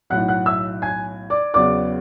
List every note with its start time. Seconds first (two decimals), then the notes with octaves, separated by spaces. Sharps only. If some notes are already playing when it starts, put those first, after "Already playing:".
0.10 B1 A2 F#3 F#5 F#6
0.28 F#5 F#6
0.46 E5 E6
0.82 G#5 G#6
1.30 D5 D6
1.54 E2 C#3 F#3 B3 D5 D6